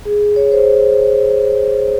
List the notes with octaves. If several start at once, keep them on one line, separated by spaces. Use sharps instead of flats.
G#4
C#5
C5